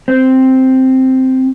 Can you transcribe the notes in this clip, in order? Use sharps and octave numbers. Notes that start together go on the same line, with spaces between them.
C4